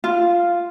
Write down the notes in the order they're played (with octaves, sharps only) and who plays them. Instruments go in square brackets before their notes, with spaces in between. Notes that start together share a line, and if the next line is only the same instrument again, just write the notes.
[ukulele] F4